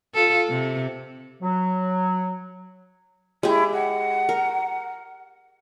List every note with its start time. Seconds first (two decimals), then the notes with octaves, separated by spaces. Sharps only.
0.14 F4 A4
0.49 C3
1.41 F#3
3.43 G#3 E4 G4
3.72 F#5
4.29 A#4